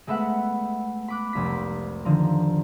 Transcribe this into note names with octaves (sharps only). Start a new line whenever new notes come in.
G#3 A3 B3 E5 F#5
B5 D6 F#6
F1 C2 B6
D3 D#3 F3 A#5